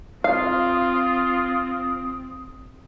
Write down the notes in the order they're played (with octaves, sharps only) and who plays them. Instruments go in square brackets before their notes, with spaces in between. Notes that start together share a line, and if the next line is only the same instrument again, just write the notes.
[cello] C4 [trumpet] F4 [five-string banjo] F5 [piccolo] D#6